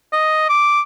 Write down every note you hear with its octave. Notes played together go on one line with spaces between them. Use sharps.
D#5
D6